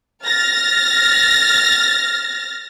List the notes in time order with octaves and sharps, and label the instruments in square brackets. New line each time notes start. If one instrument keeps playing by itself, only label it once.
[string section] F6 A6 A#6